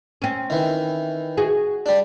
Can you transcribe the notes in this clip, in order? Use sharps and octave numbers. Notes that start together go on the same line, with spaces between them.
C4 C#4
D#3 E3
F#4 G#4
G3 D4